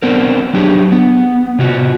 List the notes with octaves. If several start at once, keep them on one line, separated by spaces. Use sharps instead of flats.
B3 C4 D4 A#4
F#3 D4 G4 G#4
B3
C3 F4 F#4